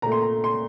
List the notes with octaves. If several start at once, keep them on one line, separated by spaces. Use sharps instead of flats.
A#2 A3 A#5
C6
A#5
C6